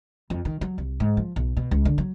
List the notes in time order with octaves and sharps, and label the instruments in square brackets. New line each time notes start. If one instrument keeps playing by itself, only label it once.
[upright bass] F2
D#3
F#3
C2
G#2
F3
B1
B2
C#2
D3
F#3